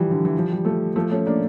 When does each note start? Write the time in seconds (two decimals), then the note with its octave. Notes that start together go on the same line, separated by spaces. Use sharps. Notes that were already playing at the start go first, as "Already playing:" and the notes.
Already playing: E3 F3 G3
0.11 D3
0.25 E3
0.38 F3
0.51 G3
0.65 F3 A3
0.96 F3 A3
1.11 A3 C#4
1.26 A#3 D4